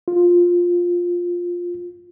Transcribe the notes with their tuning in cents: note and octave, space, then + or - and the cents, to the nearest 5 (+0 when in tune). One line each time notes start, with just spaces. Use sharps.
F4 +10